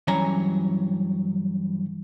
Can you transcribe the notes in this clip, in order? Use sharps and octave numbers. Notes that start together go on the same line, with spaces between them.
G2 E3 F#3 C#4 C#5 A#5